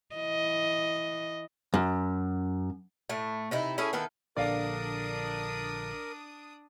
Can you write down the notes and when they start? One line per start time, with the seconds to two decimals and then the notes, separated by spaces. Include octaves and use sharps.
0.15 E3 D#5
1.74 F#2
3.09 A2 A3
3.51 C3 D#4 E4
3.78 C#4 E4 G#4 A4
3.93 D#3 B3 E4 A4
4.37 A#1 D3 D4 A#4 D5 F5 D#6 D7